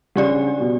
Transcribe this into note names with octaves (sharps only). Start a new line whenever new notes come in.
C#3 G3 D4 G4 D5
B2